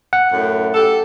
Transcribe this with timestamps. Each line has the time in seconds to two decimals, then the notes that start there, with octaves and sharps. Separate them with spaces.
0.13 F#5
0.33 F#2 A2
0.74 G4 A4